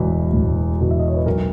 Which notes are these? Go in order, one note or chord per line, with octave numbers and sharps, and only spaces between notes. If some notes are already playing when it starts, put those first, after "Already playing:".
Already playing: E1 E2 B2 E4
E1
E2 B2
E5
D#5
C#5
B4
B1 F#4 A#4